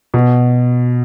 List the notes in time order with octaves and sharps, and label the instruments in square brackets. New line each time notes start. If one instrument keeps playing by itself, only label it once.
[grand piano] B2